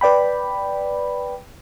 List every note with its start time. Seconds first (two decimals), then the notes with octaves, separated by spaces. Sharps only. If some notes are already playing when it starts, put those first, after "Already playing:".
0.01 B4 D5 G5 B5